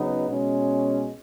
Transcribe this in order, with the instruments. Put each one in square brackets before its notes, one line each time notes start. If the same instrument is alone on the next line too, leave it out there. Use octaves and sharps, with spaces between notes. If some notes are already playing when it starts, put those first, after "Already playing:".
Already playing: [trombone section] C#3 F#3 B3 D#4
B2 G#3 C#4